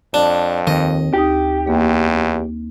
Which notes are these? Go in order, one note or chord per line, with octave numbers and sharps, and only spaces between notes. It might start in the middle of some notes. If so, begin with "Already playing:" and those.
F2 D4
D#2 C4 D#5
D2 D#4 G4 D#6
E2 A#3